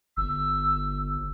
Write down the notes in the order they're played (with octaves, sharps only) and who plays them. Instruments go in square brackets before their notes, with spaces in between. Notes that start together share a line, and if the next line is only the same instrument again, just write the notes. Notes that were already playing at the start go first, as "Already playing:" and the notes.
[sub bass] G1 [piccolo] E6